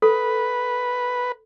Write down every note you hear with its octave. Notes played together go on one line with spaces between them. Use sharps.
A4 B4